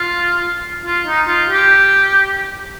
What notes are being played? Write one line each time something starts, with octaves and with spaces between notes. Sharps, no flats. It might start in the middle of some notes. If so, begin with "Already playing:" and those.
Already playing: F4
F4
D#4
F4
G4